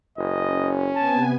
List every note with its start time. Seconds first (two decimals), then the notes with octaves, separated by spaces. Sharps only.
0.18 F#1 D#5
0.50 C#4
0.96 C3 B3 G#5 A5